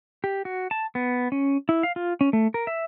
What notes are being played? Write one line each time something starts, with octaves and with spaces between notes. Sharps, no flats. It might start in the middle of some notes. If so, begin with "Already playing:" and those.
G4
F#4
A5
B3
C#4
E4
F5
F4
C#4
A3
A#4
E5